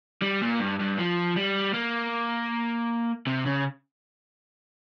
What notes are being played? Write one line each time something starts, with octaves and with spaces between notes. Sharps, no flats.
G3
A#2
G2
G2
F3
G3
A#3
C3
C#3